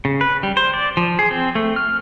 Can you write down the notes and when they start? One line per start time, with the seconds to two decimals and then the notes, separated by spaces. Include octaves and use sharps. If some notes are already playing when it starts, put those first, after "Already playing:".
0.05 C#3
0.21 B4
0.43 G3
0.57 C5
0.74 D5
0.97 F3
1.19 G#4
1.31 C4
1.55 A3
1.76 F6